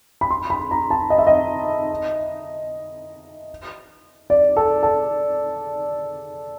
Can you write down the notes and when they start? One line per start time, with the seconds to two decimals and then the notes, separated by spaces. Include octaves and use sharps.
0.21 B5
0.31 C6
0.50 B5
0.71 A#5
0.90 A5
1.10 D#5
1.18 E5
1.27 D#5
4.30 D5
4.56 A4
4.83 A4